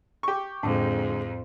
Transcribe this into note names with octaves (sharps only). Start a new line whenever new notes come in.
G4 C#6
F2 A2 D3 G#3